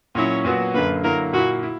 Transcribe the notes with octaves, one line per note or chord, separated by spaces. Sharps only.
A#2 F#3 C#4 E4 C#5
A#2 F#3 B3 F#4
F#2 D3 A#3 B4
D3 F#3 A#3 E4 A#4
A#2 A#3 E4 F#4
E4